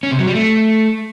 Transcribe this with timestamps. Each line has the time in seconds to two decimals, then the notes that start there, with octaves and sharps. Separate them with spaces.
0.03 C#4
0.11 C3
0.19 F#3
0.27 G3
0.35 A3